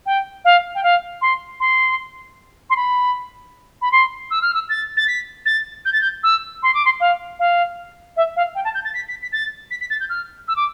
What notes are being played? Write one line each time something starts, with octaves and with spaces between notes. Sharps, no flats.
G5
F5
G5
F5
C6
C6
C6
B5
B5
C6
E6
F6
E6
A6
A6
B6
A6
G6
A6
G6
E6
C6
D6
C6
F5
F5
E5
F5
G5
A5
G6
A6
B6
B6
B6
A6
B6
B6
A6
G6
F6
E6
D6